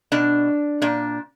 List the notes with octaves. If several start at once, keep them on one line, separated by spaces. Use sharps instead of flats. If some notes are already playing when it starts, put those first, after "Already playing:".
B2 D4
A#2 D4